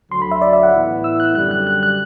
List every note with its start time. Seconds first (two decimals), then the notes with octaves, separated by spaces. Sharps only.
0.11 D2 D3 F#3 C6
0.22 B5
0.31 E5
0.42 D5
0.53 E5
0.63 F#5
0.74 A2 E3 B3 E4
1.04 E6
1.20 F#6
1.35 F#2 D3 G3 F#6
1.51 F#6
1.67 F#6
1.83 F#6